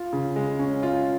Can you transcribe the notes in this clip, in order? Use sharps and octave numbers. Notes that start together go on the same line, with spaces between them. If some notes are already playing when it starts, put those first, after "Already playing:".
Already playing: F4
C#3
G#3
C#4
F4